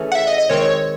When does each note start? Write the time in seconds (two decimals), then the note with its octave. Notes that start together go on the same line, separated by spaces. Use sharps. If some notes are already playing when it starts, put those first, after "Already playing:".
Already playing: E3 A3 C#4 G#4
0.12 F#5
0.15 E5
0.27 D#5
0.38 D#5
0.49 D#3 G#3 C4 C#5